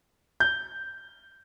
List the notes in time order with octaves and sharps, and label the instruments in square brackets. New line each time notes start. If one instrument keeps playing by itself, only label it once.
[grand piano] G6